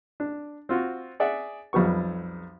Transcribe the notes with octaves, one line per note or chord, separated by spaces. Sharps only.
D4
C4 F4 F#4
G#4 D5 E5 F#5
B1 F2 G3 B3 C#6